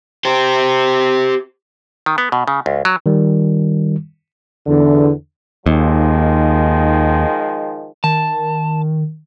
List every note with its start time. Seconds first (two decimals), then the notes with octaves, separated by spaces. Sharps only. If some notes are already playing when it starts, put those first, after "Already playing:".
0.25 G4 C5
2.06 D#3
2.18 B3
2.32 B2
2.48 C#3
2.66 C#2
2.85 F#3
3.06 D#3 G3
4.67 E2 D3
5.66 D#2 D#3 F3 G#3
8.04 D#3 A5